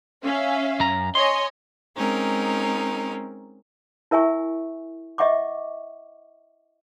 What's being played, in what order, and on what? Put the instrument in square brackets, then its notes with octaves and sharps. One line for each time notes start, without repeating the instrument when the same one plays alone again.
[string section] C#4 E5 F5
[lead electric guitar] F#2 A#5
[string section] C#5 D#5 G#5 [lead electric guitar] C6
[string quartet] G#3 C4 C#4 D#4 A#4
[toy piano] E4 A#4 E5 G#5 C#6
D#5 E5 F#5 C#6 D6